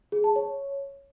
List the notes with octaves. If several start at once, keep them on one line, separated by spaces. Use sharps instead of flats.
G#4
A5
C#5